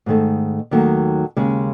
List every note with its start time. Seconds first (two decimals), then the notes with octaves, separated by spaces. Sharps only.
0.06 G#2 D#3 A3
0.71 D#2 D#3 F#3 A3
1.37 D#2 C#3 G#3